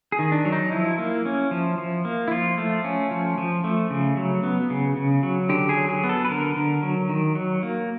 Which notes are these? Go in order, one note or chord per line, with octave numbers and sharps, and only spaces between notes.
G#4
D#3
D4
F#3
D#4
F3 E4
A#3
C#4
F3
F3
A#3
E4
F3 F4
A3
C#4
F3
F3
A3
C#3
F#3
B3
C#3
C#3
F#3
D3 G4
G#4
F#3
G#4
B3
A4
B4
D3 A#4
D3
F#3
D#3
F#3
A#3